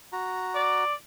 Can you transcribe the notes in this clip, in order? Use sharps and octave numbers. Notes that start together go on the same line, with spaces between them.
F#4 A#5
D5